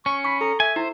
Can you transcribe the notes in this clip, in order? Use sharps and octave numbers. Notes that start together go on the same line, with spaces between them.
C#4 C#6
B5 C#6
A4 A#5
E5 G#5
E4 C5